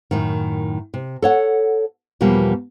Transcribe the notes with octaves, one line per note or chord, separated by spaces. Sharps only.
F#2 A2 D#3
C3
A4 C#5 F#5
E2 B2 F3 G3 A#3